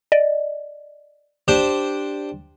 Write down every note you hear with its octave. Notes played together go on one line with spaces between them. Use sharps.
D5 D#5
D4 G4 C5 E7